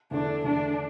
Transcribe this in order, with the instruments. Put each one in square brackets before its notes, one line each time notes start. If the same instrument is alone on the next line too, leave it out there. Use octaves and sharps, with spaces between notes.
[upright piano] E2 D3 A3 E4 [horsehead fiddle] D4
[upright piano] E2 D3 A3 [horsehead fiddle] D4